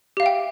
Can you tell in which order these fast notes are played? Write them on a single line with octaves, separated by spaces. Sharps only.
G4 F5 E5 G5